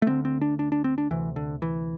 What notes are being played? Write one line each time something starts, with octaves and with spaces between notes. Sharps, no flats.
A3
D2 D3 C4
C4
D4
D4
D4
C4
D4
D2 C3 E3
D3
E3